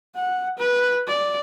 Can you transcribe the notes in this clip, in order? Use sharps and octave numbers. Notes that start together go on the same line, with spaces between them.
F#5
B4
D5